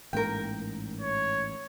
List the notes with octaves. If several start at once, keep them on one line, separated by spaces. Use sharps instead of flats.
A1 G#2 A#3 A#4 G5
C#5